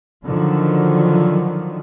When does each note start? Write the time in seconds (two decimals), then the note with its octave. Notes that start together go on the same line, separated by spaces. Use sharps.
0.24 D3 D#3 F3 F#3